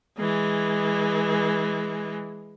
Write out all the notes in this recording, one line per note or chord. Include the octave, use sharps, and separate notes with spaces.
E3 G#3